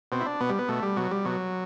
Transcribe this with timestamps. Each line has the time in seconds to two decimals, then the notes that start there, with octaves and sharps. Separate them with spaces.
0.12 B2 C4
0.20 E4
0.26 D4
0.40 B2 B3
0.49 G3
0.59 B3
0.68 B2 A3
0.83 G3
0.96 B2 F#3
1.11 G3
1.25 B2 F#3